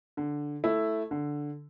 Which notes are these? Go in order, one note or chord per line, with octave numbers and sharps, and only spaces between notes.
D3
A3 E4
D3